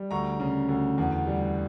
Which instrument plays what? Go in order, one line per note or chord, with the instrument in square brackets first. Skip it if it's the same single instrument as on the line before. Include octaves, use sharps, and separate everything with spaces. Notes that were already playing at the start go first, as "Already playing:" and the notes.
Already playing: [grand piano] G3
D2 A#5 C#6
C#3
D2
E2
G3